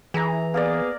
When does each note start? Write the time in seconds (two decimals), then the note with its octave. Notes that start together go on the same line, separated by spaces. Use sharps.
0.14 E3 G#4 A#5
0.54 A#3 B3 G#4 A#4 D5